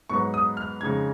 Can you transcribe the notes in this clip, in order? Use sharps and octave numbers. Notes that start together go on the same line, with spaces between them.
G#2 F#3 B3 D#4 C#6
D#6
F6
F2 C#3 G#3 D#4 G#6